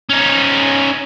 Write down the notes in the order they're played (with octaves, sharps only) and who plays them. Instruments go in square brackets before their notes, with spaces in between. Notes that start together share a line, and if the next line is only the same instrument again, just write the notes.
[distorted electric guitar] C#4 D#4